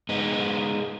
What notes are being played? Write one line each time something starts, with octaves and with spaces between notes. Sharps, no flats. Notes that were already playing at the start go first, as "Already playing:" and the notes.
G#3 B3 D#4